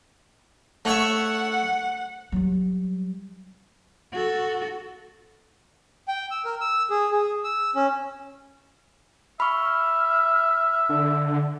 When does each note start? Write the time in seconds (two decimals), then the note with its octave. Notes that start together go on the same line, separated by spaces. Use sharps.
0.85 A3 C#5 E5 F#5
2.32 F#3 G3
4.12 F#4 A4
6.08 G5
6.31 E6
6.45 A#4
6.61 E6
6.90 G#4
7.12 G#4
7.44 E6
7.75 C#4
9.40 E5 B5 C#6 F6
10.89 D3